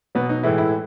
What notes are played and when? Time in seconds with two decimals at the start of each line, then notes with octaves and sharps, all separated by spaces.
0.15 B2 F#3 B3
0.29 D#4
0.43 A2 E3 G#3 E4
0.58 E4